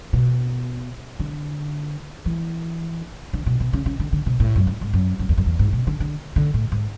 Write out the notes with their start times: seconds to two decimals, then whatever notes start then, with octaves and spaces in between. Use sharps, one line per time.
0.13 B2
1.20 D3
2.26 E3
3.33 D3
3.46 B2
3.60 B2
3.73 C#3
3.86 C#3
4.00 D3
4.13 D3
4.26 B2
4.40 A2
4.56 F#2
4.67 G#2
4.81 G#2
4.93 F#2
5.19 F#2
5.29 E2
5.38 F#2
5.46 E2
5.59 G#2
5.73 B2
5.87 D3
6.00 D3
6.36 D3
6.54 A2
6.72 G#2